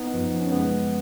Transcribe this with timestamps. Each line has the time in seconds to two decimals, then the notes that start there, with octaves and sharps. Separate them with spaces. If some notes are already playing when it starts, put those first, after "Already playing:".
Already playing: B3 D#4
0.14 F#2 F3
0.41 C#4
0.52 F#2 C#3 F3 G#3 B3